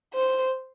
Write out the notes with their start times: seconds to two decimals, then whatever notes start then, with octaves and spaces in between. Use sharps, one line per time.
0.14 C5